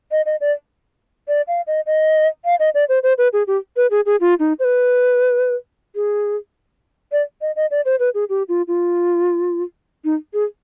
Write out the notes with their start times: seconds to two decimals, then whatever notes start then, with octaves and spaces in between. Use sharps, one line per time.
0.11 D#5
0.26 D#5
0.41 D5
1.28 D5
1.48 F5
1.67 D#5
1.86 D#5
2.45 F5
2.59 D#5
2.74 D5
2.89 C5
3.03 C5
3.18 B4
3.33 G#4
3.47 G4
3.77 B4
3.91 G#4
4.06 G#4
4.21 F4
4.40 D#4
4.59 C5
4.64 B4
5.95 G#4
7.12 D5
7.41 D#5
7.56 D#5
7.71 D5
7.85 C5
7.99 B4
8.14 G#4
8.29 G4
8.49 F4
8.68 F4
10.05 D#4
10.34 G#4